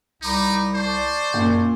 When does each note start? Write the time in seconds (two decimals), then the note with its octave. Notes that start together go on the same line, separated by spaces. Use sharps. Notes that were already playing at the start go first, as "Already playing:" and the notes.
0.22 C2 D#4 A#5 B5 D6
0.75 C5 D5 A5 C#6
1.34 F#2 A#2